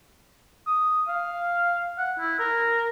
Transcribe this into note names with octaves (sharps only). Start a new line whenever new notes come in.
D#6
F5
F#5
E4
A#4